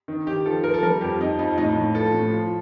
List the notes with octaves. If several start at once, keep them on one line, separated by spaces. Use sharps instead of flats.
D#3
D#3 G4
F3 A4
F3 A#4
A4
G3 A#4
F2 G4
F2 D#4
F2 D#4
A2 D#4
A2
F3 A4
A2
F3